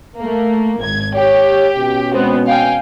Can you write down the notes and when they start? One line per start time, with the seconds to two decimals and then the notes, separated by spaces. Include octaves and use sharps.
0.17 A3 A#3
0.78 G#1 G#6
1.14 G4 C#5
1.77 B2 C#4
2.13 G#3 B3 C4
2.47 F5 G5 G#5